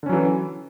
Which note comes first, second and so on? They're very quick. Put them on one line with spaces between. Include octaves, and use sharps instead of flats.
D3 C#4 F#3 E3